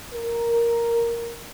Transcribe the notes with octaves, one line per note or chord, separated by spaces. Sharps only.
A#4